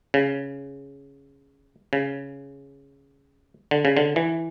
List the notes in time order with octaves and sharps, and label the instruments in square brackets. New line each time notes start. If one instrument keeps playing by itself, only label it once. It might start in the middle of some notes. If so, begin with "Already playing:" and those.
[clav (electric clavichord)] C#3
C#3
D3
C#3
D3
E3